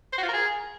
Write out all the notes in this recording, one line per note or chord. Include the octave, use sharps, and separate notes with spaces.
C5
F#4
F4
A#4
G#4